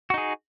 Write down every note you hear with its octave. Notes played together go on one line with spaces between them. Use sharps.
D#4 F#4 G#4